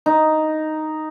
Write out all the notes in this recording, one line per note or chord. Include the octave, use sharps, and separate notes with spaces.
D#4